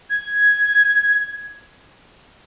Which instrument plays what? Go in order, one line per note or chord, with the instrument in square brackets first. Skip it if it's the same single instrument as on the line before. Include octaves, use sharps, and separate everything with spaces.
[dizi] G#6